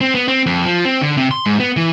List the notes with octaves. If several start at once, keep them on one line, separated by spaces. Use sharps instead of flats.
C4
B3
C4
F2
F3
C4
D3
C3
C6
G#2
B3
E3